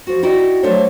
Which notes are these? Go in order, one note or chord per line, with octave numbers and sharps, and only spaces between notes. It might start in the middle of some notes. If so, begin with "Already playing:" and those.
F3 F#4
D#4 E4 F#4 G4 D5 D#5
F#3 A3 D4 A4 C5 C#5